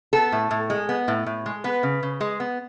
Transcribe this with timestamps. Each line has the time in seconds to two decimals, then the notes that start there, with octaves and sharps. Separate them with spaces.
0.13 B3 A4
0.32 A2
0.51 A2
0.70 G#3
0.89 B3
1.08 A2
1.26 A2
1.46 G#3
1.64 B3 B4
1.83 C#3
2.03 C#3
2.21 G#3
2.40 B3